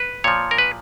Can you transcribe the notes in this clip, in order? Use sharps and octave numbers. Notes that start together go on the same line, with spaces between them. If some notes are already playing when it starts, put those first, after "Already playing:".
Already playing: B4
A#2 F3 C#5
A#4
B4